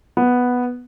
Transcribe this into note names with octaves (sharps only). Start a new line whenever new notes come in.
B3